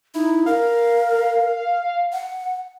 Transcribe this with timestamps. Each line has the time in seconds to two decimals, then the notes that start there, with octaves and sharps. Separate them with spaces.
0.14 D#4 E4
0.46 A#4 F5
2.13 F#5